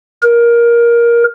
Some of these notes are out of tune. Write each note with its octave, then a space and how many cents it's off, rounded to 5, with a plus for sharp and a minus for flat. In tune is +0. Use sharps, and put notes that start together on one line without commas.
A#4 +15